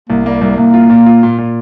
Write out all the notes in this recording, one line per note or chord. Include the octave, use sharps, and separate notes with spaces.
C2 A#3
G3 A#3
C2 G3
C2 A#3
F4
A#2
F4
A#2
A#2